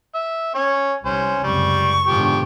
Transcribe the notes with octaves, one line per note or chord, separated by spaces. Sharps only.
E5
C#4 C#5 C#6
C2 C#4 C5
C#2 F#2 C3 G3 C#6
G#2 B2 D3 F3 G4